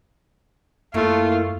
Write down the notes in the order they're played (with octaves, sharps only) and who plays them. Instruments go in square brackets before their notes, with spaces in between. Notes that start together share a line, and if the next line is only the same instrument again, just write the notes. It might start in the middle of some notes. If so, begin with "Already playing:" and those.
[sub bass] F#2 [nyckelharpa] A3 [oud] A#3 E4 C#5 [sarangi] F4